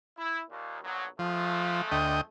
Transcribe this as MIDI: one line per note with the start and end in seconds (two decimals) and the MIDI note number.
0.18 0.42 64
0.50 0.79 39
0.50 0.79 46
0.83 1.05 34
0.83 1.05 47
0.83 1.05 54
1.19 2.25 41
1.19 1.82 53
1.19 2.25 56
1.19 2.25 57
1.91 2.21 38
1.91 2.21 75
1.91 2.21 79